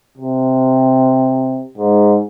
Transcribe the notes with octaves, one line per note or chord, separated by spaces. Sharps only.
C3
G#2